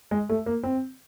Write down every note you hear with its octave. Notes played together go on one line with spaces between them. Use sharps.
G#3
A3
A#3
C4